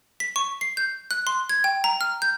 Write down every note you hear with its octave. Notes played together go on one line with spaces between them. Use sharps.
B6
C#6
C7
G6
F#6
C6
G#6
G5
A#5
F6
G6